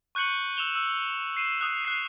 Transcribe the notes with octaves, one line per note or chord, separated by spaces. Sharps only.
C#6 F#6 G6 C#7 F#7
E6 E7 F7 G7
E6
C7 D#7 E7
D#6 F#6
F#6 C7